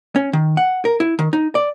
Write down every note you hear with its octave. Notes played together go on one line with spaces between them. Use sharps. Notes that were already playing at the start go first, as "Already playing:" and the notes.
C#4
D#3
F#5
A#4
E4
D#3
D#4
D5